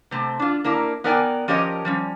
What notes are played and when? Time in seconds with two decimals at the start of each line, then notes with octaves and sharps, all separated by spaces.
0.11 C3 A3 C4
0.39 D4 F4
0.64 A#3 D4 E4 A#4
1.04 B3 D#4 A#4 D5 G5 G#5
1.48 F3 C#4 G4 A#4 C#5 D#5
1.85 F3 G3 C#4